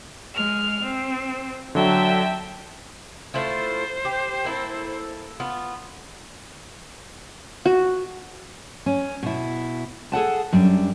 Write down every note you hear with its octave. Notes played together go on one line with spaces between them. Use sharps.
G#3 F6
C4
D3 F#3 E5 G5 A5
A3 E4 F4 C5
G4
A#3 E4 A4
B3 F4
F#4
C#4
B2 E4
G#4 A4 F#5 A5
F#2 G3 D4